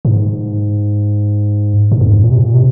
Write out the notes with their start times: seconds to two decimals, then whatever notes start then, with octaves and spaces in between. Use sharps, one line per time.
0.05 G#2
1.92 G#2
2.01 F2
2.10 G#2
2.24 A#2
2.31 C3
2.39 A#2
2.54 C3